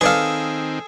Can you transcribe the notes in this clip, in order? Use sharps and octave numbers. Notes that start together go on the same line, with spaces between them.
D#3 C4 G#4 A4 B4 D5 F5